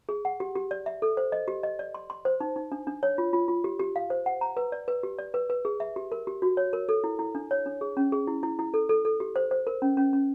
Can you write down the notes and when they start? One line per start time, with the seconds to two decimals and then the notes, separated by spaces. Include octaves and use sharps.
0.09 G#4
0.25 F#5
0.40 G4
0.56 G4
0.71 D5
0.86 E5
1.02 A4
1.17 C5
1.32 D#5
1.48 G4
1.63 D#5
1.79 D5
1.94 C6
2.10 C6
2.25 C5
2.40 D#4
2.56 D#4
2.72 D4
2.87 D4
3.03 C#5
3.18 F4
3.33 F4
3.48 F4
3.64 G4
3.80 G4
3.96 F5
4.10 C5
4.26 F#5
4.41 A#5
4.57 B4
4.72 D5
4.88 B4
5.03 G4
5.19 D5
5.34 B4
5.50 B4
5.65 G#4
5.80 E5
5.96 G4
6.12 A#4
6.27 G4
6.42 F#4
6.57 C#5
6.73 A#4
6.89 A4
7.04 E4
7.19 E4
7.35 D4
7.51 C#5
7.66 D4
7.81 G#4
7.97 C#4
8.12 G#4
8.27 E4
8.43 E4
8.59 E4
8.74 A4
8.89 A4
9.05 A4
9.20 G4
9.36 C5
9.51 C5
9.67 A#4
9.82 C#4
9.97 C#4
10.13 C#4